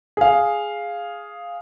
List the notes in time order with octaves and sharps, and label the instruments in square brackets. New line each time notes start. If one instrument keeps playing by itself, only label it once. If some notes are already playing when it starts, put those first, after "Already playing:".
[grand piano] G#4 F5